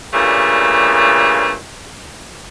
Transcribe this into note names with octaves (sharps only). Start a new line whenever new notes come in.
G2 A#2 C#3 G3 A3